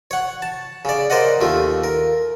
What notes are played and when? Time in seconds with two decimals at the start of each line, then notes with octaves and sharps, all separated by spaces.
0.11 C#5 F#5
0.42 A5
0.85 C#3 D5
1.10 A#4 C5 D5 D#5 F#5
1.41 D#2 A3 F4
1.84 A#4